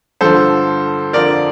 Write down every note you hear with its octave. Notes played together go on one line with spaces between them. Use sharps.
G2 D3 F3 A4 C5
F2 D3 F3 A#4 D5